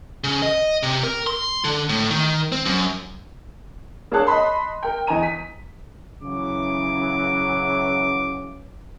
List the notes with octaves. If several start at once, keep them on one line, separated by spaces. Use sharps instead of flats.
C#3
D#5
C3
A#4
C6
D3
A2
D#3
C4
F#2
A#3 D4 G#4 C#5 A5 F#6
D#5 A5 B5 C6
A#4 G5
E2 D#5 G#5 A#5 D#7
B6
C#3 E3 F#3 D6